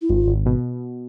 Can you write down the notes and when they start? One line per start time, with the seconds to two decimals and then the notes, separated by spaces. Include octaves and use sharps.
0.02 E4
0.09 G#1 F4
0.27 G#1
0.46 B2